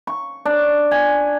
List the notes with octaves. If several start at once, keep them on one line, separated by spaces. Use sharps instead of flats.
C#6
D4
G#5